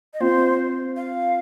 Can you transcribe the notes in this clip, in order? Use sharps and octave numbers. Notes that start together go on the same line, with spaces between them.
D#5
C4 F4 C5
F5